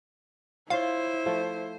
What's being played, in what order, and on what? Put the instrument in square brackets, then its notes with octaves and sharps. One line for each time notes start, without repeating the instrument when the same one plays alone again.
[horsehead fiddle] E4 [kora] F4 C#5 [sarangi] C5 [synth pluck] F5
[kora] F3 A3